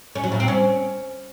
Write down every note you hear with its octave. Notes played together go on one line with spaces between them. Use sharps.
C#4
F#3
A#2
C4
C#4